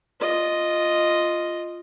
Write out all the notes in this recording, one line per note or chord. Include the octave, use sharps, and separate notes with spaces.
F4 D#5